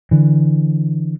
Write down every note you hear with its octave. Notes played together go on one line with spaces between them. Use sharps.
D3 E3